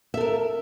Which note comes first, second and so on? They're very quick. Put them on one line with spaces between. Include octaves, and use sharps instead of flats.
E5 A4 A#4